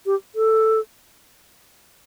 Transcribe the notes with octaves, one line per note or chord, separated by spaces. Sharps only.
G4
A4